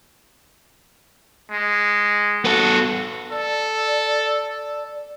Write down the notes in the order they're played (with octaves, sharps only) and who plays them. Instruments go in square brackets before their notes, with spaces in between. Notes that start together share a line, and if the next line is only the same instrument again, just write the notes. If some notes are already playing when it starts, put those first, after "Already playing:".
[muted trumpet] G#3
[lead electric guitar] B3 A4 [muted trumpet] F#4
[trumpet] A4 [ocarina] D5